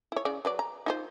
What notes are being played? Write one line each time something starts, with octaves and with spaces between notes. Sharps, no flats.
E4 C#5
C#3 D5
F#3 B4 D5
A#5
D#4 F4 C5